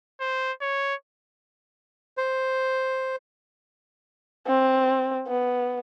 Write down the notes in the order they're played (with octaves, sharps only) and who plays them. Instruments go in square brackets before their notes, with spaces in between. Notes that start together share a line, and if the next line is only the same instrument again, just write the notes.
[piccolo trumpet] C5
C#5
[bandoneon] C5
[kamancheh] C4
B3